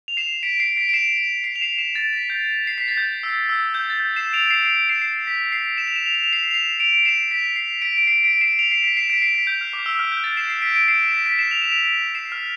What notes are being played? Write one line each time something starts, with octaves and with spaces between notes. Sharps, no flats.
F7
C7 E7
B6 D7
C7
B6 D7
D7
C7 E7
C7
F7
C7 E7
C7 E7
A6
B6
G6
C7
B6
A6
G6
E6
E6
G6
A6
G6
C7 E7
D7 F7
C7 E7
D7 F7
C7 E7
C7
B6
C7
E7
F7
E7
F7
E7
F7
C7 E7
F7
C7 E7
D7 F7
C7 E7
B6 D7
C7
B6 D7
D7
C7
B6 D7
C7 E7
D7 F7
C7 E7
B6 D7
C7 E7
B6 D7
C7
B6
G6
F6
D6
E6
F6
G6
A6
C7 E7
C7
B6 D7
D7
C7 E7
E7
B6 D7
B6 D7
C7 E7
F7
E7
D7 F7
C7 E7
F6